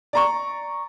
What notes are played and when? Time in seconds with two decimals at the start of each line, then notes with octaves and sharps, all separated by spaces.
0.13 D5 A#5 C#6